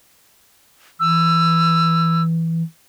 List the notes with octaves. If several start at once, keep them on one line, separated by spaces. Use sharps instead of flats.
E3 E6